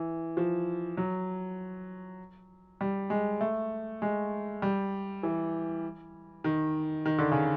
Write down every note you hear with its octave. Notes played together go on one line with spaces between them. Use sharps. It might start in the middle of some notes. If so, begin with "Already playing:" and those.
Already playing: E3
F3
F#3
G3
G#3
A3
G#3
G3
E3
D#3
D#3
D3
C#3